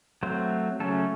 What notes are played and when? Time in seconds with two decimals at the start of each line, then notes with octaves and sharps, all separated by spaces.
0.23 F#3 A3 C4 C5
0.80 C#3 F#3 A3 C#4 A4